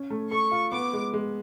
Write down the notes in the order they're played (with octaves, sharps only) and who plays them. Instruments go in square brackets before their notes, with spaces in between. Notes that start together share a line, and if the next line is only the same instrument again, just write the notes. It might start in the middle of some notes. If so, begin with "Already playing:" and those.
Already playing: [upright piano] C#4
A3
[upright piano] A4 [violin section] C#6
[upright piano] F4
[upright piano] B3 [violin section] D6
[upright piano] G#3
G#3